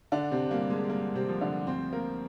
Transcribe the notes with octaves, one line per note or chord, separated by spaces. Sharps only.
D3 D4
C3 C4
G2 A#3
G#3
G2 A#3
C3 C4
F3
D3 D4
D2 C4 C5
A#3 A#4